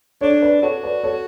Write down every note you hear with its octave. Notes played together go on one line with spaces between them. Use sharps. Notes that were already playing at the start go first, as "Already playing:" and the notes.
D4 A4 C#5
B4 D5
F#4 A4 C#5
B4 D5
A4 C#5